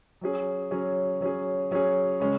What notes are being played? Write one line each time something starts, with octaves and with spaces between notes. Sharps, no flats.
F#3 C#4 G#4
F#3 C#4 G#4
F#3 C#4 G#4
F#3 C#4 G#4
C#3 G#3 C#4